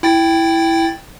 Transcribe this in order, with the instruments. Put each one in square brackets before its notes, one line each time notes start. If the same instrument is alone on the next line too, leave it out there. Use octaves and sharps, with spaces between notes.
[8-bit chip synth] E4 G5 A6